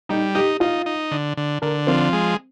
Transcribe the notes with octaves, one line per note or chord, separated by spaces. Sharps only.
G3 D#4
D#4 G4
D#4 F4
D#4
D3
D3
D3 A#4
F3 C4
G#3